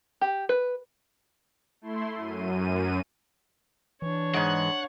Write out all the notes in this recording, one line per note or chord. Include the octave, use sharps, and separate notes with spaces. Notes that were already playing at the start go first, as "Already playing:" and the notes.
G4
B4
A3 E4 C6
F#2 D#7
E3 D4 C#5
G#2 G#3 F#5